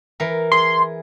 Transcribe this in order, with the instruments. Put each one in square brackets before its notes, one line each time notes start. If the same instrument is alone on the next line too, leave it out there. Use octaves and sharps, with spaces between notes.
[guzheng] E3 A#4
[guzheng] G#4 [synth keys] C6